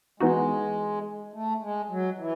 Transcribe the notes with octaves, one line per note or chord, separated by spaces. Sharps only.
E3 G#3 B3 D#4 F#4
A3
G#3
F#3
E3